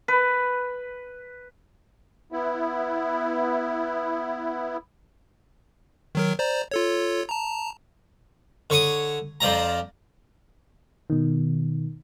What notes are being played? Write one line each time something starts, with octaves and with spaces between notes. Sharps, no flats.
B4
B3 E4
D#3 F#3 A#4
C5 D5 A#5
F4 A4 C#5
A5 A#5
D3 C#5 C#6 D#6
F2 F3 D5 A#5
B2 D#3